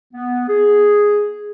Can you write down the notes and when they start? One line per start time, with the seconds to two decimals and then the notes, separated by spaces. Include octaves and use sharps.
0.14 B3
0.49 G#4